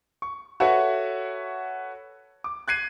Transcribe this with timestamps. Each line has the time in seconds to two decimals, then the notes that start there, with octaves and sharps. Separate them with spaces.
0.22 C#6
0.60 F#4 A4 B4 C#5 E5 F#5
2.44 D6
2.68 F#6 G#6 C7 D#7